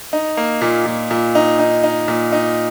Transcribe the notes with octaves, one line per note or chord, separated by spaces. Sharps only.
D#4
A#3
A#2
A#2
A#2
D#4
D#4
D#4
A#2
D#4